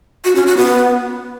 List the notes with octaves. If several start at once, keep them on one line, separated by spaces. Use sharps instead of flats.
F#4
C#4
F#4
B3